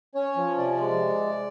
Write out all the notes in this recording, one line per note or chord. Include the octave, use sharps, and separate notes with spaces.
C#4 C#5
F3
C3 D5
G#3